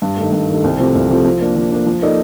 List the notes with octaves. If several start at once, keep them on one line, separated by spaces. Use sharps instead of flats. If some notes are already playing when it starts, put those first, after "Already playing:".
G2
D#3 A3
G2
D#3 A3
C2
C3 F3 A3
C2
C3 F3 A3
F3
A#3 D4
F3
A#3 D4
F3
A#3 D#4 A4 D5